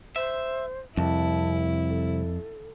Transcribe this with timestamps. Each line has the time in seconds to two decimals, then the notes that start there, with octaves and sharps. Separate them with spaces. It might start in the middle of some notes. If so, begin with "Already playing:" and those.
0.16 C5 E5
0.97 C2 F2 E4 A5
1.88 A4